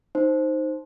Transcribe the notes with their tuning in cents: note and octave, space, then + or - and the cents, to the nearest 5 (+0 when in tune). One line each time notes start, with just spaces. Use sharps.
D#4 +0 C5 +5